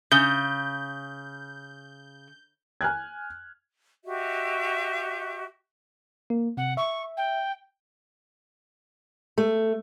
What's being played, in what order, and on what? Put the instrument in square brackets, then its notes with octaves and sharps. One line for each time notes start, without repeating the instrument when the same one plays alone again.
[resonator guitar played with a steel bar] C#3 [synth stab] G6
[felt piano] G#5 F6 F#6 G#6
[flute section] F#4 G4 D#5 E5
[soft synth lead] A#3
[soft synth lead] C3 [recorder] F#5
[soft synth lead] E5 [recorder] C#6
[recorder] G5
[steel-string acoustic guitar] A3